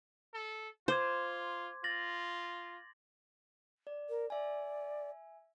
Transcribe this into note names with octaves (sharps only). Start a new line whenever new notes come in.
A4
F4 C5 C6 D6 G#6
F4 A6 A#6 F#7
D5
A#4
D5 E5 G#5